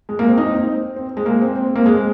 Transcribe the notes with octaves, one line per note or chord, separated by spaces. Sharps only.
G#3
A#3
C4
D#4
C4
C4
G#3
A#3
C4
C4
A#3
G#3